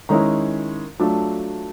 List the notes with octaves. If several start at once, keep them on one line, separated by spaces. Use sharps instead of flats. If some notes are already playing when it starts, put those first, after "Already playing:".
D#3 G#3 C#4 E4 A#5
F#3 A3 D4 F4 A5